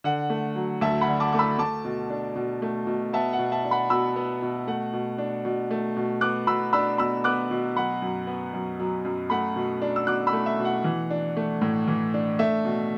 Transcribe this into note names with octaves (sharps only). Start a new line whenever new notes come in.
D3 F#5
A3
F#3
D2 E5 A5
F#5 B5
D3
A5 D6
A3 D6
B5 E6
A3 A5 D6
B2
D4
B2
A3
B2
B3 E5 A5
F#5
B2
E5 A5
D4
F#5 B5
B2 B5 E6
B3
B2
A3 F#5
B2
D4
B2
A3
B2
B3 D6 F#6
B2 B5 E6
D4 B5 E6
B2 B5 E6
B3 D6 F#6
B2
F#3 F#5 B5
F#2
B3
F#2
F#3
F#2
A3 F#5 B5
B2
D4
E6
B2 D6 F#6
B5 E6
A3
E5
B2
F#5
E3
D4
A3
A2
E3
D4
A3 E5
B2